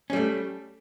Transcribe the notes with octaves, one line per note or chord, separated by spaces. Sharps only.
G3 A3 C#4